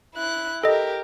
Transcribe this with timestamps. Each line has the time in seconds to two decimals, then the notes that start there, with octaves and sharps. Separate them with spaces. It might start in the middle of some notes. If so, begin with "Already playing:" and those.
0.15 E4 F#6
0.63 G4 A4 A#4 D#5